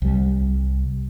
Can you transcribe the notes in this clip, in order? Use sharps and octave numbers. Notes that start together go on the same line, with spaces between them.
C2 G3